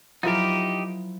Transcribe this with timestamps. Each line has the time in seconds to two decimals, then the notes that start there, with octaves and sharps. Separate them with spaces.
0.23 F3 F#3 D#4 E4 G4 A#4